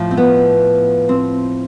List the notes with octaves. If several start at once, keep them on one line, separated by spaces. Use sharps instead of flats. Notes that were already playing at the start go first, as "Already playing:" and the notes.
Already playing: A2 F3
C4
B3
C4